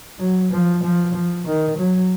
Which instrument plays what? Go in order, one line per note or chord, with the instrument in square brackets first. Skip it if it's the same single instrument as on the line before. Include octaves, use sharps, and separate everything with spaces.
[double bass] F#3
F3
F3
F3
D#3
F#3